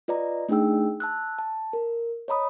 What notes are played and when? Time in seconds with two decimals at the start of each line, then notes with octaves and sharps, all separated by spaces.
0.08 F4 B4 D5 D#5 A#5
0.49 A3 D4 D#4 G#4 G5 E6
1.00 A5 E6 F#6
1.38 A5
1.73 A#4
2.28 C#5 D#5 A#5 B5 D#6